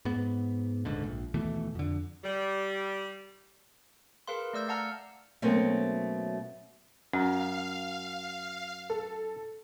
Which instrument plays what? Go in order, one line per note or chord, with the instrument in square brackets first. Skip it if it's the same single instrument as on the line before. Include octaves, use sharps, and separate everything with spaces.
[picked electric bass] G#2 B3
D#1 C#2 G#2 D3
A#1
D#2 B2 E3 A3
F2 D3
[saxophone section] G3
[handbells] G#4 A#4 B4 F5 C6
A3 D5 E6 G6
F5 F#5 A5 A#5 E6 F6
[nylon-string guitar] B2 F#3 A3 A#3 C4 C#4
[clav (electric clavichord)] F#2 [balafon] C#4 [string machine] F5
[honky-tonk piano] A4